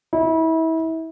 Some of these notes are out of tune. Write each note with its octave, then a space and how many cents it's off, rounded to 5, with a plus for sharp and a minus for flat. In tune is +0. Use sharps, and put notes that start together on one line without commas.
E4 -30